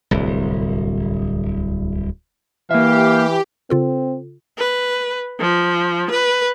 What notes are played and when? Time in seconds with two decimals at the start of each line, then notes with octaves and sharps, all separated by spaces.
0.11 D1 C2
2.71 E3 A#3 G4 E5 F5
3.70 C#3 C4 F4 A4
4.58 B4
5.40 F3
6.11 B4